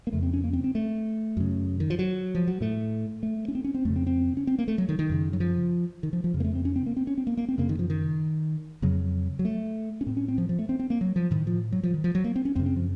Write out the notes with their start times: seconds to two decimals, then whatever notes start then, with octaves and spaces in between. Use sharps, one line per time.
0.07 A#3
0.12 F2 C#3 A3
0.23 C4
0.33 C#4
0.44 A#3
0.53 C4
0.64 C4
0.75 A3
1.37 F#2 C#3
1.80 D#3
1.90 F3
1.99 F#3
2.35 F3
2.47 F#3
2.61 A2 A3
3.23 A3
3.48 C#4
3.55 C4
3.64 C#4
3.74 C4
3.85 F2 A3
3.89 C#3
3.96 C4
4.07 C4
4.37 C#4
4.47 C4
4.59 A#3
4.68 A3
4.78 F#3
4.89 D#3
4.99 D#3
5.09 F#2 C#3
5.33 F#3
5.40 F3
6.03 D#3
6.13 F3
6.24 F3
6.34 F2 C#3
6.40 A#3
6.44 A3
6.55 C4
6.65 C#4
6.76 C4
6.86 A#3
6.97 C4
7.07 C#4
7.18 C4
7.27 A#3
7.37 A#3
7.49 C4
7.58 F#2 C#3 A#3
7.69 D#3
7.79 F3
7.90 D#3
8.82 F2 C#3 F#3
9.39 F#3
9.45 A3
10.01 C#4
10.07 A2 C4
10.17 C#4
10.28 C4
10.38 F3
10.49 F3
10.59 A3
10.69 C4
10.79 C4
10.90 A#3
11.01 F#3
11.16 F3
11.31 A2 D#3
11.47 F3
11.72 F#3
11.83 F3
11.94 D#3
12.04 F3
12.15 F#3
12.24 A#3
12.36 C4
12.45 C#4
12.55 F#2 C#3 C4
12.66 C4
12.76 F3